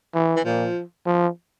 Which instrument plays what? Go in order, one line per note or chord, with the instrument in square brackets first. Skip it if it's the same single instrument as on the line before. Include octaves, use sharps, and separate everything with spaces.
[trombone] E3
[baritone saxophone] E3
[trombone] A#2 [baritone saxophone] F3
[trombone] F3